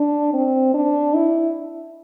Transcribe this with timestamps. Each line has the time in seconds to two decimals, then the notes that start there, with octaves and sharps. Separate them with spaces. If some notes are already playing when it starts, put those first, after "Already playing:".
Already playing: D4
0.33 C4
0.74 D4
1.14 E4